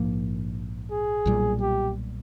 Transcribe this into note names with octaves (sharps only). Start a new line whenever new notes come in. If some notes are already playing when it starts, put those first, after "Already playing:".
Already playing: A#1 G#2 F3 A#3
G#4
B1 A#2 G3
G4